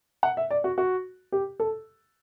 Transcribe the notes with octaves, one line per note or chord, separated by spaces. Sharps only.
F#5
E5
D5
F#4
F#4
G4
A4